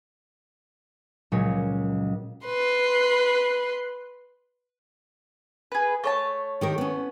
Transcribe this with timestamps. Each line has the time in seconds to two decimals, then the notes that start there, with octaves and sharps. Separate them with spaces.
1.32 C#2 A#2 F#3 G#3 C#5
2.46 B4 C6
5.72 G#4 B4
6.04 A3 C#5 A5
6.61 D#3 G4 A#4
6.78 B3 C#4